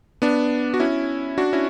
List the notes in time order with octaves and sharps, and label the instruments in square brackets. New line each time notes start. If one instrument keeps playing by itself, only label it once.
[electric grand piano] B3 D4
F#4
C#4 E4
D4 F#4
C#4 E4